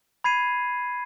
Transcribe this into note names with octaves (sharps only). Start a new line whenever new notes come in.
B5 G#6 C7 D#7